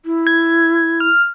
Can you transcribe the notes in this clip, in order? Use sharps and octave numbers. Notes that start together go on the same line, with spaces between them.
E4
G#6
F6